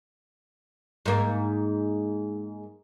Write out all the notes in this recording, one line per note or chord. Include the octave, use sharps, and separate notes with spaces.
G#2 A#3